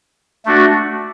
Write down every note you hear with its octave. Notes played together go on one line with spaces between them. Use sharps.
A3 D4 F#4